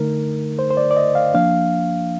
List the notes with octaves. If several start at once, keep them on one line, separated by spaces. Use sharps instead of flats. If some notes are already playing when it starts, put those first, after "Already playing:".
Already playing: D3 A3 D#4 A#4
C5
C5
D5
D5
D#5
F5
F3 A#3 D4 F5